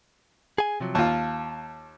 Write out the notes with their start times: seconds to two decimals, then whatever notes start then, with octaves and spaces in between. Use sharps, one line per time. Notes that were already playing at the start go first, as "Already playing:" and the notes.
0.58 G#4 G#5
0.80 C3 F3 F#3
0.95 D#2 F4 A5